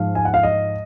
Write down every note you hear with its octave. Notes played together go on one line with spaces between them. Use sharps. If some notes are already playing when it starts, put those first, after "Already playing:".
Already playing: G#2 F3 F5
G#5
F#5
F5
D#5